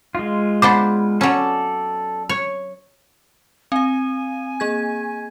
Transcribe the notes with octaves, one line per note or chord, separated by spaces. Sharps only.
G#3 F4
B3 D4 C5 D6
F#3 C#4 A4 D5
C#5
C4 F5 G#5
A#3 G#4 G#6